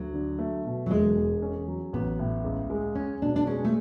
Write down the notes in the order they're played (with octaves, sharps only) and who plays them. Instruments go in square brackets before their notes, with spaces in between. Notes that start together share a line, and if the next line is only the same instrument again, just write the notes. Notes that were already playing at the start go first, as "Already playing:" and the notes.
Already playing: [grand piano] D2 [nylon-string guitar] F#3
[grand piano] D3
A3
B2
[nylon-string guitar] F#3
[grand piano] E1 [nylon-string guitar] G#3
[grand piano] E2
C#4
F#3
[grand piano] A1 [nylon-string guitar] B3
[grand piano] A2
C#2
G#3
[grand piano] C#2 [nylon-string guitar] C#4
[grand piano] B2 [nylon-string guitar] D4
[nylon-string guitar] D4
[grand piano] G#3 [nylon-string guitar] C#4
[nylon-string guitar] A3